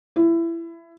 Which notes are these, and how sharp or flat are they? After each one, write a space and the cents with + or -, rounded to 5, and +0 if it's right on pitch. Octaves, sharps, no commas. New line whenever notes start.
E4 +20